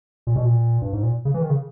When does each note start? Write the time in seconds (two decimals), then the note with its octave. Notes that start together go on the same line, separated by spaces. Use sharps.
0.27 A#2
0.36 B2
0.45 A#2
0.82 G2
0.93 G#2
1.03 A#2
1.25 C#3
1.34 E3
1.42 D#3
1.50 C#3